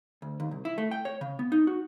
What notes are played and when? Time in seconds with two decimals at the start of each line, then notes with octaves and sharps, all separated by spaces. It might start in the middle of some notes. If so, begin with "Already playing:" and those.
0.22 D2
0.40 D#2
0.51 C2
0.65 E4
0.78 A3
0.91 G5
1.05 C#5
1.21 C#3
1.39 B3
1.52 D#4
1.67 F#4